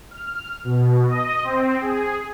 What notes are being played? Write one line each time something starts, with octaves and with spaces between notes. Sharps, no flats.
F6
B2
D#5
C4
G#4